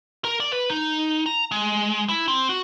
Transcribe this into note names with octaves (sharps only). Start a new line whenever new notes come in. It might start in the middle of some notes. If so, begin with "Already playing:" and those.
A#4
D5
B4
D#4
A#5
G#3
E4
C4
F#4